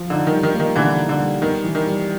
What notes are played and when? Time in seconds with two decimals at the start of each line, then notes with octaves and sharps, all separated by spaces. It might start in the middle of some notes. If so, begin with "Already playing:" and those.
Already playing: F3
0.10 D3 D#4
0.27 D#3 G3
0.43 D#3
0.54 A#3
0.60 D#3
0.76 B2 D3 E3
0.98 D#4
1.09 D3
1.20 G3
1.42 D#3 B3
1.64 E3
1.75 D#3
1.86 G3